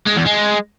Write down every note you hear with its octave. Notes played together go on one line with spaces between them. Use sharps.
G#3
E2
G#3